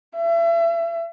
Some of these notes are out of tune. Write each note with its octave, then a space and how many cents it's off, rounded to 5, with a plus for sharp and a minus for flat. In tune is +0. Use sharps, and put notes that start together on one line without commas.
E5 +35